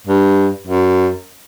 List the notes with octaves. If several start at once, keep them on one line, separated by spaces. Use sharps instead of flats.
G2
F#2